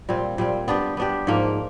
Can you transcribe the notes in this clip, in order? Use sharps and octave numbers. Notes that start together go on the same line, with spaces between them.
A#2 G3 C4
A#2 G3 C4
B3 D4 G4
B3 D4 G4
G#2 F3 A#3